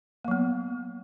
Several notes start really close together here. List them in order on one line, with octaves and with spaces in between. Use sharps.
A#3 F#3 B3